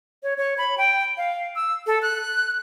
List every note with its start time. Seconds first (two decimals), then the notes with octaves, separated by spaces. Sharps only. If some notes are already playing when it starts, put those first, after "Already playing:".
0.23 C#5
0.38 C#5
0.58 B5
0.78 G5
1.17 F5
1.56 E6
1.87 A4
2.02 F#6